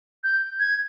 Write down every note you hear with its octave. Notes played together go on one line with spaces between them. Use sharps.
G6
G#6